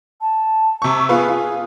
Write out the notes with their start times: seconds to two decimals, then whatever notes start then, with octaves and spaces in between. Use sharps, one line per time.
0.21 A5
0.82 C3 C#6
1.09 B3 F4 G#4 B4
1.29 F4